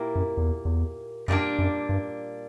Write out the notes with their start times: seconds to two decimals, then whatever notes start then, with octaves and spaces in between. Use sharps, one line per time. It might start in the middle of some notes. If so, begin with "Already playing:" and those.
Already playing: A#2 A#3 E4 G4 A#4
0.15 F#2
0.37 E2
0.65 E2
1.28 F#2 A#2 G3 A#3 D4
1.59 F#2
1.89 G2